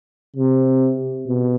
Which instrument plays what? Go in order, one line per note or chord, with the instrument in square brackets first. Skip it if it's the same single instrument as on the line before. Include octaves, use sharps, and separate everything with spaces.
[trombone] C3
B2